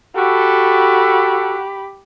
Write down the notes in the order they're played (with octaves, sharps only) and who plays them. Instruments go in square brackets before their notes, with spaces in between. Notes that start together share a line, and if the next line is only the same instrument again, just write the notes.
[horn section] F#4 A4 [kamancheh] G4 B5